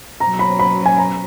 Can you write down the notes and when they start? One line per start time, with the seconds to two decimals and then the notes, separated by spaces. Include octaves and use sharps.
0.20 B2 F#3 C#4 A#5
0.39 B5
0.59 B5
0.86 G#5
0.98 A#5